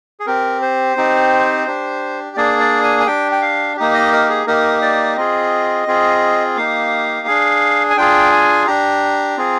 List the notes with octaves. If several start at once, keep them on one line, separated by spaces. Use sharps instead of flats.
G#4
C4 G4 A#4
C5
C4 D#4 G4
D4 G4
A#3 D4 G#4 D5
D5
G#5
G#5
D4 G4 G5
G5
F5
A#3 D#4 G4
D#5
A#4
G#4
A#3 D#4 G4 A#4
D5
C4 F4 G#4 D#5
C4 F4 G#4
A#3 D#4 G4 F5
D4 G#4
G#5
D4 F4 G#4 G5
G#5
D4 G4 A#5
C4 F4 G#4